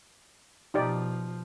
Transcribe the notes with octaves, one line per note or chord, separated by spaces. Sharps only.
B2 F3 D#4 G4 D5